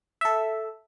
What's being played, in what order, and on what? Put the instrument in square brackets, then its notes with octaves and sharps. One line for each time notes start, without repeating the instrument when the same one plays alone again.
[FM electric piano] A4 E5